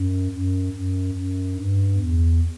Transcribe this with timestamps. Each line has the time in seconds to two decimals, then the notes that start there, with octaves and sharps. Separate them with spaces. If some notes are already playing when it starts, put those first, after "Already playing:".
Already playing: F#2
0.32 F#2
0.73 F#2
1.14 F#2
1.56 G2
1.96 E2